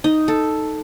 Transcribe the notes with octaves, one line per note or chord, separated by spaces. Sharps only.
D#4
A4